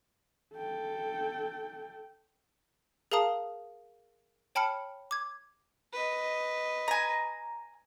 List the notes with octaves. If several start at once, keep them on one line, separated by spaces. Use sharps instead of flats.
A4 G5
G#4 A#4 F5 A5 A#5 D#6
C#5 G5 A5 B5 F6 C#7
D6 G#6
B4 D#5
G#5 A#5